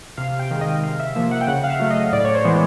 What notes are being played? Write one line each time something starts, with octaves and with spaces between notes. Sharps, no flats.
C3 F5
G5
D#3 G#3
D#5
C3 F5
E5
F3 A#3 E5
F#5
G5
C#3 F#5
F5
E5
F#3 A3
D#5
A2 D5
C#5
C5
E3 G#3 B3